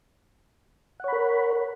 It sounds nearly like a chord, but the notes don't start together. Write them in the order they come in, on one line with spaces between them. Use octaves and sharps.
F#5 C#5 B5 A#4